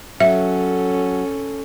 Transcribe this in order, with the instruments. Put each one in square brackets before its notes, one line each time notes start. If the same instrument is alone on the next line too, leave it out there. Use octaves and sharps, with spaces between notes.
[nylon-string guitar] F#3 [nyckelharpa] C#4 A4 [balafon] E5